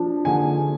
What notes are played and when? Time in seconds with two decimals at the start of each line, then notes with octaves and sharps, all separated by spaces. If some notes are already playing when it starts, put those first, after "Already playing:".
Already playing: F3 D4
0.25 D3 G#5